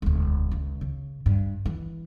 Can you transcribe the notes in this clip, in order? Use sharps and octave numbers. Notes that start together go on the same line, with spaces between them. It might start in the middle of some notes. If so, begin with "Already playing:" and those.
E1 D2
C#2
C#3
G2
E3